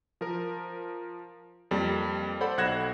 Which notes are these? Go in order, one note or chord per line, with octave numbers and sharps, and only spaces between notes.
F3 A#4
F2 G3 A#3
A4 C5 D5 F#5 B5
B1 F#5 F#6 G#6 A#6 E7